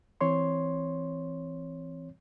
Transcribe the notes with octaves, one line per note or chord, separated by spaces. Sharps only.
E3 C4 C#5 C6